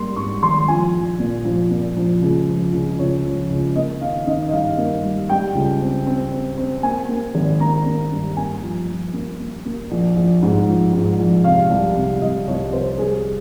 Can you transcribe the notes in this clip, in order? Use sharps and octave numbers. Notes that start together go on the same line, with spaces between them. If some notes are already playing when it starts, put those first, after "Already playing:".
Already playing: G#2 G3 A#3 C6
G#2 C#6
G#1 C6
F3 G#5
A#1
A#2
F3
A#2
F3
C#2
F3
C#2
C#2 C#5
F3
C#2
A#3 D#5
D#3 F5
D#3 D#5
D#5
G2 F5
A#3
G3
G3 G5
C#2
C4
C4
C4
C4
A#3 G#5
A#3
G#1
A#3 A#5
A#3
G2
A#3 G#5
F3
F3
A#3
A#3
A#3
A#1
A#1
G#2
F3
G#2
A#1
C3 F5
C2
C3
C2 D#5
C2 C#5
C3 C5
G3 G#4